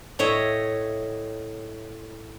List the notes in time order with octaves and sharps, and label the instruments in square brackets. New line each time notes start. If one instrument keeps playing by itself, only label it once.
[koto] A2 C#5 D#5 E5